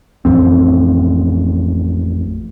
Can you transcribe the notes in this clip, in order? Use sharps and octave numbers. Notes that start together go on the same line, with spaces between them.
A1 F2 C4